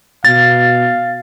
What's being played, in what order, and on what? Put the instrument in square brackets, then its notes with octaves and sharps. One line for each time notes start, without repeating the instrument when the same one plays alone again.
[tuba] B2 [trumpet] F5 [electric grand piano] A6